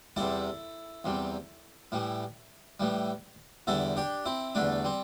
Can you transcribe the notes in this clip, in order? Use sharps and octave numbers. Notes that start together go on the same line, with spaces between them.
E2 C3 G3 E4 A4
E2 C3 G3
A2 E3 G3
A2 E3 G3
E2 D3 G3 E4 A4
D4 G4
C4 E4
E2 D3 G3 A3 D4
G3 C4